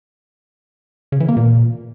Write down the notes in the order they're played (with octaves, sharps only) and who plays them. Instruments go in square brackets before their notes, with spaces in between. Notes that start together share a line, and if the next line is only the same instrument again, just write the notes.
[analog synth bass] C#3
E3
A#3
A#2